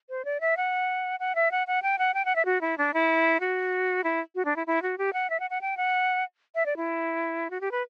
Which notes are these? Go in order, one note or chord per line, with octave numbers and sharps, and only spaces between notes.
C5
D5
E5
F#5
F#5
E5
F#5
F#5
G5
F#5
G5
F#5
E5
F#4
E4
D4
E4
F#4
E4
F#4
D4
E4
E4
F#4
G4
F#5
E5
F#5
F#5
G5
F#5
E5
D5
E4
F#4
G4
B4